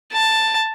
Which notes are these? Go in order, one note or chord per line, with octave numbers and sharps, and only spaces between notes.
A5